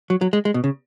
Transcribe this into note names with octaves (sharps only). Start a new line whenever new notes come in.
F#3
F#3
G#3
G#3
B2
C#3